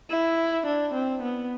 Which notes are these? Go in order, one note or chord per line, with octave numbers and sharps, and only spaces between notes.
E4
D4
C4
B3